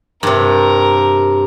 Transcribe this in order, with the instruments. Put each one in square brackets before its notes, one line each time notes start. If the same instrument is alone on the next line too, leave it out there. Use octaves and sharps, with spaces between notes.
[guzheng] G2 C3 [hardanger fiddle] A#4